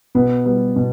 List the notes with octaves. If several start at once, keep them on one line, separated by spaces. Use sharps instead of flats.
B2 B3
G3 B3
B2